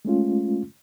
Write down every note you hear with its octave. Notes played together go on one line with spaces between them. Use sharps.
G#3 A3 C#4 F4